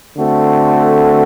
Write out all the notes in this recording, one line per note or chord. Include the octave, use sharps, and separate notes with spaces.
D3 A3 C4 F#4 A4